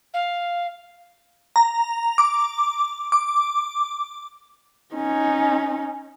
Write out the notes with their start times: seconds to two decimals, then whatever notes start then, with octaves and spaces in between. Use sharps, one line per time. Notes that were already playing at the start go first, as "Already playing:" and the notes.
0.14 F5
1.56 A#5
2.18 D6
3.12 D6
4.95 C#4 D#4